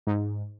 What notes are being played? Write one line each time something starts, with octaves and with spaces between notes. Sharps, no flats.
G#2